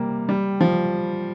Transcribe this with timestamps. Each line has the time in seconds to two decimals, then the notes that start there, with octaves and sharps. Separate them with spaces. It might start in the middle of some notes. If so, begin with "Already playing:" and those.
Already playing: C3 G3 A#3
0.29 G3
0.61 F3